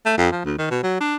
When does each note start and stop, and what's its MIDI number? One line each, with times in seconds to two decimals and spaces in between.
0.06 0.15 57
0.18 0.30 41
0.31 0.41 53
0.45 0.54 38
0.58 0.67 51
0.71 0.78 47
0.83 1.00 54
1.00 1.16 62